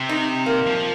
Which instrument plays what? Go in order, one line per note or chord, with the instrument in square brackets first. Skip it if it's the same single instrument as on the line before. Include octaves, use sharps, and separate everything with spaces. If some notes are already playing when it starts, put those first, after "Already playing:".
Already playing: [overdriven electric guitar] C3
[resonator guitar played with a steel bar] D#4
A#3
[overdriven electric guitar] F3